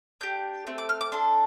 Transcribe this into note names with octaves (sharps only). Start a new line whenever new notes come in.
D4 G4 G6
A3 C4
D6
F6
D6
D4 A4 C6